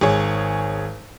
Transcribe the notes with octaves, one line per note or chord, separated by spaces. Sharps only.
G#1 G#4 C#5